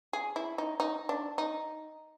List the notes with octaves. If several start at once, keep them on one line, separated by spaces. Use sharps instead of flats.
G#4
E4
D#4
D#4
D4
D#4